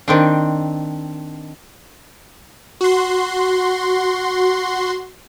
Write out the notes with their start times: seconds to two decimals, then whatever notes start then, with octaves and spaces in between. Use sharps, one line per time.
0.08 D#3 C4 D4
2.81 F#4 C6